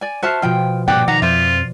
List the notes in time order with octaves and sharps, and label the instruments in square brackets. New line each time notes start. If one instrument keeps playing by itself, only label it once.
[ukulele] D5 G#5
[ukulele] F#4 E5 A5 [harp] C5 F6 C7
[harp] B2 F3 [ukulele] F4 G5
[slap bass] G2 A#2 [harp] D5 D6 [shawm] F#5 [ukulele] G5
[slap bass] D#3 [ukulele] F#5 [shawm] A#5
[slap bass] F2 [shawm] F4 [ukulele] C5 E5